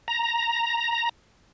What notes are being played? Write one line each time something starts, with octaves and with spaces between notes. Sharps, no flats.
A#5